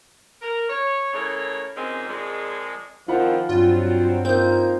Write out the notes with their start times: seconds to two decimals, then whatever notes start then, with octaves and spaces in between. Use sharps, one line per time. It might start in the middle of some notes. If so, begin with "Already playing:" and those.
0.42 A#4
0.70 C#5
1.14 A2 C#3 A3 A#4 C#5
1.76 A#2 D#3 G#3 C4 C#4
2.09 F2 A#2 G#3
3.08 D#3 F3 C4 F4 F#5 B5
3.49 G2 F#3 C4 F4
4.25 A#3 C4 D#4 F4 G6